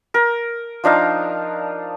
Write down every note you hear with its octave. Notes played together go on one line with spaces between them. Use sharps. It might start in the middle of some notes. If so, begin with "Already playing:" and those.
A#4
F3 D4 D#4 F5